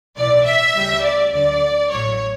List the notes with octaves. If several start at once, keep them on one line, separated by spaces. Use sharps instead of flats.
B1 A2 E3 D5
E5
D2 C#3 G3
D5
D2 D3 F#3 D5
A1 A2 F#3 C#5